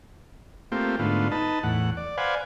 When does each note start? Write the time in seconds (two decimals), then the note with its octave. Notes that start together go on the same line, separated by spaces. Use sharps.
0.72 A3 A#3 C4 F4 G4
0.99 G#2 D3 A3 B3 F4
1.31 D#4 B4 A5
1.63 E2 A2 F#5
1.97 D5
2.17 B4 C5 D5 F5 F#5 G#5